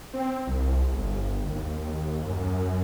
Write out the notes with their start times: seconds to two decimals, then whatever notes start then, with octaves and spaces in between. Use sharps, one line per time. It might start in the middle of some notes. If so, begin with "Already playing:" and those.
0.13 C4
0.47 C2
0.92 G1
1.47 D#2
2.25 F#2